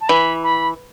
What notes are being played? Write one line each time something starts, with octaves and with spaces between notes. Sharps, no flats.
A5
E3 B5
B5